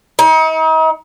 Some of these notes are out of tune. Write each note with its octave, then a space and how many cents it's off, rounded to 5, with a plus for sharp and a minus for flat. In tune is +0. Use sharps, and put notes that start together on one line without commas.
D#4 +40